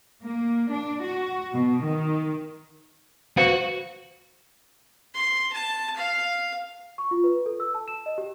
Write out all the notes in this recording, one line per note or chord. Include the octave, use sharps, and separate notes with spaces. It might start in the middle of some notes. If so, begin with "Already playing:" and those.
A#3
D4
F#4
B2
D#3
F#4 B4 C5 F5
C6
A5
F5
C#6
F4
B4
A4
E6
A5
E7
D#5
G4